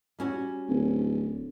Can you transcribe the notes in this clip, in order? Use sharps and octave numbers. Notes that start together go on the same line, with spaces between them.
G3 C#4 F#4
D1